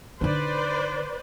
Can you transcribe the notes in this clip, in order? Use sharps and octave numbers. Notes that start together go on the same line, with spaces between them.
D3 D#4 B4 C5 D5